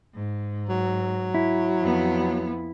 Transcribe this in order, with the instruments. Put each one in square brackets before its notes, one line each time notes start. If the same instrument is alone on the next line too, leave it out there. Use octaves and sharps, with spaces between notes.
[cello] G#2
[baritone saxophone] F#3
[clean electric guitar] E4
[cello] F2 B3